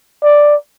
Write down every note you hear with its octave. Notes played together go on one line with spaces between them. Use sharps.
D5